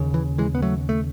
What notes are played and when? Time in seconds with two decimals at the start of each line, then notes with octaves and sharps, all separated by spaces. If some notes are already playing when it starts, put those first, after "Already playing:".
Already playing: D#2 C#3
0.14 E3
0.38 E3 G#3
0.55 B3
0.62 F#3 A3
0.89 A3